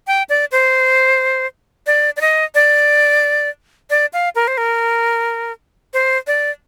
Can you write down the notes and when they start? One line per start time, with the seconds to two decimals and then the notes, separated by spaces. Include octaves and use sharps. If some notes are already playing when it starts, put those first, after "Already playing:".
0.07 G5
0.29 D5
0.52 C5
1.87 D5
2.17 D5
2.21 D#5
2.55 D5
3.90 D5
4.13 F5
4.35 A#4
4.48 C5
4.57 A#4
5.94 C5
6.27 D5